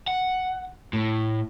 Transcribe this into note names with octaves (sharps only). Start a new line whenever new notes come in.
F#5
A2